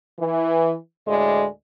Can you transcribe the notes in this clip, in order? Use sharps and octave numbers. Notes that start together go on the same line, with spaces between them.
E3
D2 A2 G#3 D5